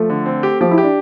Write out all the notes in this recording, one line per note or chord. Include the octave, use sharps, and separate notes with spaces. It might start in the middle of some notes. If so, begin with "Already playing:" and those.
Already playing: F3 A3
D3
C4
G4
F3 G4
E4
G4
D4